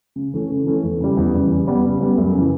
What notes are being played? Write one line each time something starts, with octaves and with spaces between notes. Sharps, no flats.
C#3
E3 A3 C#4
C#3
E3 A3 C#4
E2
C#3 G3
E2
C#3 G3
C#3
G3 B3
C#3
G3 B3
F#2
C#3 E3